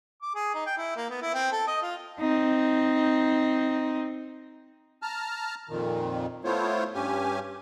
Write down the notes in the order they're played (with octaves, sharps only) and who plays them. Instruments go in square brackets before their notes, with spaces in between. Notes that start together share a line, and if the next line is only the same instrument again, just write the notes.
[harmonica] D6
G#4
D#4
G5
E4
A#3
B3
E4
C4
A4
D#5
F4
[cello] C4 D#4
[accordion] A5 A#5 F6
F2 A#2 D#3
A3 B3 E4 F4 C5 C#5
G2 C#4 G4 G#5